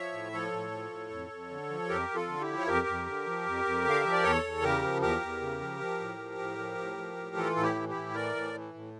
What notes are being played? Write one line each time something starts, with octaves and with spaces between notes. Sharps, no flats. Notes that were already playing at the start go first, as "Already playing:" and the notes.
Already playing: F3 C#5 E5
A2
F3 A4 C#5
A2
F3
A2
F2
F2
D3
F3
F2 G4 A#4
F2
F4 A4
D3
E4 G4
F3
C#5
F2 G4 A#4
F2
D3
F3
F2
F2
D3
F5
F3 E5
D5
E2 A4 C#5
E2
C#3 G4 A#4
F3
E2 G4 A#4
E2
C#3
F3
F3
A2
F3
A2
F3
A2
F3
A2
E3 F4 A4
A2 A4
E4 G4
E3
E4 G4
A2
E3 A#4 D5
A2
E3
A2